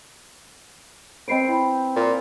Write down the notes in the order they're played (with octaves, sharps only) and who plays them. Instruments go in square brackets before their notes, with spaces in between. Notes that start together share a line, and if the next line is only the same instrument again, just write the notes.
[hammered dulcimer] C4 B4 C5 [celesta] D#5 C7 D7
[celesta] E4 B5
[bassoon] A#2